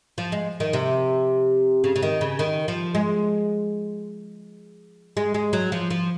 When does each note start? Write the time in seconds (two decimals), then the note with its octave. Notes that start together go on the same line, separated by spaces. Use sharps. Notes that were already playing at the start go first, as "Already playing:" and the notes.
0.18 F3
0.32 G#3
0.60 D#3
0.73 C3
1.84 C#3
1.96 C#3
2.03 D#3
2.21 C#3
2.39 D#3
2.68 F3
2.95 G#3
5.17 G#3
5.34 G#3
5.53 F#3
5.72 F3
5.90 F3